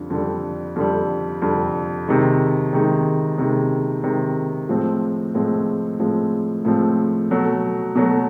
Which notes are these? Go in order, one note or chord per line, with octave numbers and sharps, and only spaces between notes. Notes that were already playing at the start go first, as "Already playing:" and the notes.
Already playing: F2 D3 G3
F2 D3 G3
F2 D3 G3
F2 D3 G3
C3 D#3 G#3
C3 D#3 G#3
C3 D#3 G#3
C3 D#3 G#3
A2 F3 G#3 C4
A2 F3 G#3 C4
A2 F3 G#3 C4
A2 F3 G#3 C4
B2 F#3 A3
B2 F#3 A3